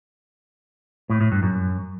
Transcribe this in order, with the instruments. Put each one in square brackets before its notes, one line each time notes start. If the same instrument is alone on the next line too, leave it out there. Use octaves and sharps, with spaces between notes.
[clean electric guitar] A2
A2
G2
F#2